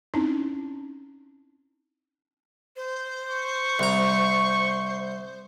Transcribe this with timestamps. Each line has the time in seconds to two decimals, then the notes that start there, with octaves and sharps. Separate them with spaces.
0.14 C4 C#4 D#4 E4
2.76 C5
3.30 C#6
3.79 C2 A#5